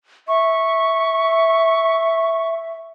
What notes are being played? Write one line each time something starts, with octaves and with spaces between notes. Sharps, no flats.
E5 C#6